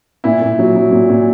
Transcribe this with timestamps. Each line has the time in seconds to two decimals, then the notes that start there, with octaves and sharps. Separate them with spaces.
0.24 A#2 E4
0.41 A#2
0.59 F#3
0.76 F#3
0.92 A#2
1.09 A#2